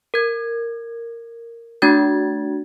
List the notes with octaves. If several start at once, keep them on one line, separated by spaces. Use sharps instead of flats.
A#4 G#6
A3 D4 F#4 G#6 A6